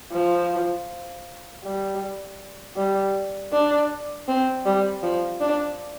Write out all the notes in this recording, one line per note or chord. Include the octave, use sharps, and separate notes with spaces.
F3
G3
G3
D4
C4
G3
F3
D4